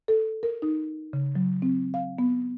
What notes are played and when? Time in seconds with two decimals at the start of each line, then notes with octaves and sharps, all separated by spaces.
0.08 A4
0.43 A#4
0.62 D#4
1.13 C#3
1.35 F#3
1.62 C4
1.94 F5
2.19 B3